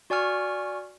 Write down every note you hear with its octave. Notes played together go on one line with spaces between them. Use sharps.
F#4 D5 G#5 C#6 F6